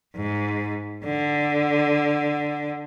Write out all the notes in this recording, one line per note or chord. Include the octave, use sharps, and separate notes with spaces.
G#2
D3